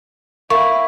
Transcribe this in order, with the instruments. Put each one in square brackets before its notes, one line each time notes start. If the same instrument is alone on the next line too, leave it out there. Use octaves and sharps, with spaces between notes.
[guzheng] A#3 [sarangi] E4 [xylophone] C#6